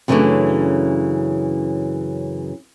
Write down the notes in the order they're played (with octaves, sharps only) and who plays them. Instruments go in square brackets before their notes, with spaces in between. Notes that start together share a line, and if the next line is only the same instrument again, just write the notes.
[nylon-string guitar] F#2 C#3 E3 G#3 A3 D4